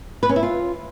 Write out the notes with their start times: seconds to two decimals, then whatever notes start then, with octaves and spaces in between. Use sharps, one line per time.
0.23 B4
0.29 C#4
0.36 E4
0.43 F4